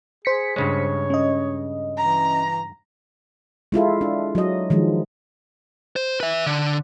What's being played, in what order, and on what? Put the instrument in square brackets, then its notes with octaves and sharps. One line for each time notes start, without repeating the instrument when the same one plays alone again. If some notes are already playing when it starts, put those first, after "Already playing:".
[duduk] G#4 [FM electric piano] C5 B6 C#7
[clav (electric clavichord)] G2 C#3 G#3 [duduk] C#5
[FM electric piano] C#4 D#5
[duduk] E3 [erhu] A#5
[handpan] G#3 E4 F4 A4
D4
F#3 D#5
D#3 F3 G#3
[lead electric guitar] C5
B4 E5
D3